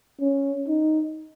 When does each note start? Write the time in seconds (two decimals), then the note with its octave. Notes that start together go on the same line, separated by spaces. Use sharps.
0.21 C#4
0.69 D#4